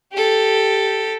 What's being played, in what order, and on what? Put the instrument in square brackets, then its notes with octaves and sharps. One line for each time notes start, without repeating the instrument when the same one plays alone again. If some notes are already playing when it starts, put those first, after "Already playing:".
[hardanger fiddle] G4 A4